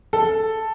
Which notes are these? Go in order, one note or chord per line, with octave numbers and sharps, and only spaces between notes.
A4